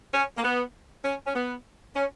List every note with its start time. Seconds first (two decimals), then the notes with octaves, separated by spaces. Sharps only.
0.14 C#4
0.38 A#3
0.44 B3
1.05 C#4
1.27 C#4
1.35 B3
1.96 C#4